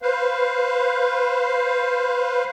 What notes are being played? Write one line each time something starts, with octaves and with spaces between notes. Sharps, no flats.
B4 C5 F5